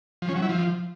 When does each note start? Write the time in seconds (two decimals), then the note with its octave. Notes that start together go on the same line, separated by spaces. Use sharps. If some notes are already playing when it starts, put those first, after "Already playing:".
0.22 F3
0.29 C#4
0.36 F#3
0.42 E4
0.49 F3